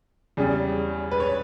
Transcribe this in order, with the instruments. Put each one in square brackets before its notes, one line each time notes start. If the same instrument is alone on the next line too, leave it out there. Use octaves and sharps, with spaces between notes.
[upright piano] E2 C#3 G3
B4
C#5